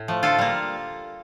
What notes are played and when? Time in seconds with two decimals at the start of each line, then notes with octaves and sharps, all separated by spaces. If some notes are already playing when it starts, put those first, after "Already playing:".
Already playing: A2
0.08 F3 A3
0.23 D3 F4 A4
0.38 G3 A#3